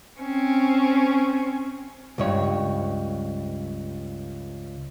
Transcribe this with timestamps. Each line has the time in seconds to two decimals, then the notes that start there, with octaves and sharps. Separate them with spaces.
0.21 C4 C#4
2.18 C#2 G2 C#5